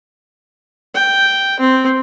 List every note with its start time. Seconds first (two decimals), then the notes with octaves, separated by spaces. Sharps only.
0.95 G5
1.60 C4